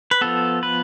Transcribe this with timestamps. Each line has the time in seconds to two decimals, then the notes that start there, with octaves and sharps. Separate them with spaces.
0.11 B4
0.21 F3 B3 A4
0.63 B4